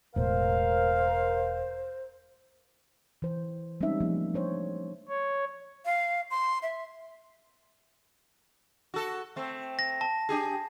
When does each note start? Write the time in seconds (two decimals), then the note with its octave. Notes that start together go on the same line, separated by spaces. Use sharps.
0.16 E1 A2 A#4 C5 F5
3.22 E3 C5
3.81 G3 G#3 C4 C#4 D#4 E5
4.00 F3 A3 A#3
4.34 D4 C5 C#5
5.09 C#5
5.86 F5
6.31 C6
6.63 E5
8.94 F#4 A4
9.36 A3 C4
9.79 A#6
10.01 A5
10.29 D4 G4 G#4